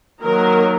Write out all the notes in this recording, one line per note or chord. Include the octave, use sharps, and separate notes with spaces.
D#3 F#3 A#3 A#4